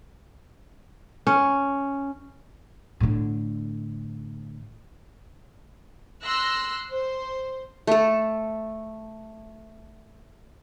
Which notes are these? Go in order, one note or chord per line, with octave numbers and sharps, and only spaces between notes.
C#4
A2 D3
C6 E6 F#6 A#6
C5
A3 A4